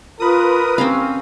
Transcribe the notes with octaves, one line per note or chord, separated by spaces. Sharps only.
F4 A#4 B4 D#6
C4 C#4 G4 F5